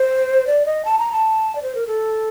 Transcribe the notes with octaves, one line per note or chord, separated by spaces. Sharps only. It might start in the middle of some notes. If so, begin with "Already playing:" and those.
Already playing: C5
D5
D#5
A5
A#5
A5
D5
C5
A#4
A4